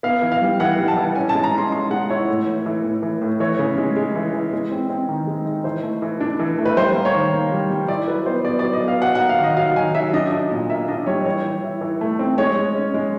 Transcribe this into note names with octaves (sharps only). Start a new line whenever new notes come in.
B3 F5
E3
F5
G3
E3 F#5
G3
A5
E3
C#4 G#5
A5
G#3
A#5
C#4 C6
G#3 C6
G#3 F#5
E4 C#5
A2
E3
E3
A2
E3
A2
E3 C#5
C#3
G#3
G#3
E3
E3
G#3
C4
C4
D#3
G#3
D#4
E3 C5
A3
E3
D4
E3
A3
B4
G3 C5
A#3
C#5
D#3
A#3
G3
G3
E4 D5
F#3 B4
B3 C5
B3 D5
F#3 D5
D#5
B3
F5
F#3 F#5
A#3 F#5
F5
D#3 D#5
F#3 F5
D#3 G#5
F#3 E5
D4 D#5
D4 D#5
A#2 D#5
A#3 E5
D4 D#5
G3 C#5
E3 C#5
E3
E4
E3
A3
C4
G#3 C#5
G#3
C#4
G#3